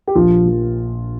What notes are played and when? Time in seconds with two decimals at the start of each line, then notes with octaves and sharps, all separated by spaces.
0.08 G4
0.15 A#1 F3 F4
0.45 A#2 F3